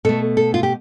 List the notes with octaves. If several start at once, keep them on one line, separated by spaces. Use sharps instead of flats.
B2 A3 A4
A4
F4
G4